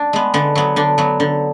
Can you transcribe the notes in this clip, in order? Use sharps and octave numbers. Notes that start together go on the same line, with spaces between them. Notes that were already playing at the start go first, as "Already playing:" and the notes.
Already playing: D4
G#3 B3
D3 B3
F#3 B3
D3 D4
F#3 B3
D3